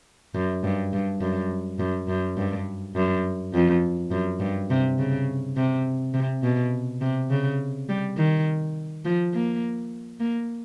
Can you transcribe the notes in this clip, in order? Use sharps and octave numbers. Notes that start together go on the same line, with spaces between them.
F#2
G2
G2
F#2
F#2
F#2
G2
F#2
F2
F#2
G2
C3
C#3
C3
C3
B2
C3
C#3
G3
D#3
F3
A#3
A#3